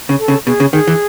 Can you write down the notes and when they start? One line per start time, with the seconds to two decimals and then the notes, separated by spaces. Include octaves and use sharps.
0.09 C#3
0.19 A4
0.28 C#3
0.47 B2 G#4
0.60 C#3
0.73 D#3 G#4
0.87 E3